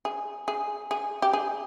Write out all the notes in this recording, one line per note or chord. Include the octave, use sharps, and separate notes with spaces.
G#4
G#4
G#4
G4
G#4